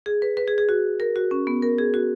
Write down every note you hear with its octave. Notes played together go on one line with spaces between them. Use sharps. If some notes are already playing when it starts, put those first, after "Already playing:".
G#4
B4
B4
G#4
G#4
F#4
A#4
F#4
C#4
B3
A#4
G#4
F#4